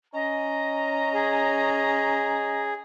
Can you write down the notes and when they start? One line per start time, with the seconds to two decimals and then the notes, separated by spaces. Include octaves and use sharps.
0.14 C#4 D#5 A#5
1.14 G#4